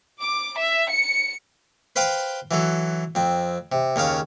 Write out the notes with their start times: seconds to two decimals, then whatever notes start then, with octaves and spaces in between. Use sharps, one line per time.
0.21 D6
0.58 E5
0.91 C#7
1.96 B4 C5 F5 G5 C6
2.51 E3 F#3 A4
3.15 F2 C4
3.72 C3
3.96 D#2 C#3 C#5 F5